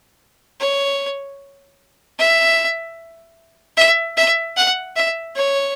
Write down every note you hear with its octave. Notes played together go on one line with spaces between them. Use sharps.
C#5
E5
E5
E5
F#5
E5
C#5